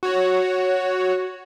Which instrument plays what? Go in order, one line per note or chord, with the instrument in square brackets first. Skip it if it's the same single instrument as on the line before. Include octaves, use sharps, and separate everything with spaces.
[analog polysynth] F#4 C#5